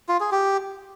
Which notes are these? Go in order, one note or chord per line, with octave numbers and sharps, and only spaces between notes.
F4
G#4
G4